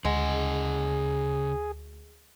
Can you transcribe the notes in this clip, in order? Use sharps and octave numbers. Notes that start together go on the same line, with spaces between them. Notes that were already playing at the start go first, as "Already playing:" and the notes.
D2 C#3 G#3 G#4 F#5